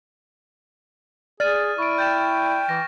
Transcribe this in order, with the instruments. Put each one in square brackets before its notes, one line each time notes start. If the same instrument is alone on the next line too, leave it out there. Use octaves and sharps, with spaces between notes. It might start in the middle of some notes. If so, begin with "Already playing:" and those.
[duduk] G#4 [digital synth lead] D5 [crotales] F6 A6 D#7
[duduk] E4 [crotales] C#6 D7
[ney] G5 [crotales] G6 A6 E7
[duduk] E3 [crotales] A#6